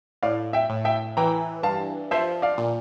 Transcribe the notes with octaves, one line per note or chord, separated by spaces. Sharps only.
A2 D5 F5
E5 G5
A2
E5 G5
E3 G5 A#5
G2 F5 A5
F3 C5 E5
D5 F5
A#2